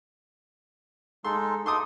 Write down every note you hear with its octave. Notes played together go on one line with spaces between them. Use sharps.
G#3 D#4 A4 C6
D#4 A4 C6 D6 D#6